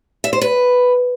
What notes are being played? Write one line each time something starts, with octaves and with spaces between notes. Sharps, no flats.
E5
C5
B4